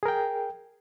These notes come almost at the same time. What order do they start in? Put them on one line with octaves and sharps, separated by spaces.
G#4 A#4 G5